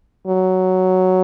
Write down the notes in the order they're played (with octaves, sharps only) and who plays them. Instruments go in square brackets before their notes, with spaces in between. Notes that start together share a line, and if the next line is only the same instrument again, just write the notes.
[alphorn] F#3